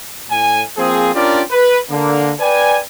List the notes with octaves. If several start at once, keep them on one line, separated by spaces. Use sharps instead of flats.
A2 G#5
F3 A#3 C4 G#4
C#4 D4 F4 G4 A#4 D5
B4
D3 A#3
B4 D5 G5 G#5